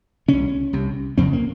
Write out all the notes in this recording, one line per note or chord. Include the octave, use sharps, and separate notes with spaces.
C2 C3 C#4
C2 C3
F2 C#3 C4
A#3